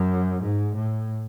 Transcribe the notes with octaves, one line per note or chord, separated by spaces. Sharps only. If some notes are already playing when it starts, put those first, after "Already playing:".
Already playing: F#2
G#2
A2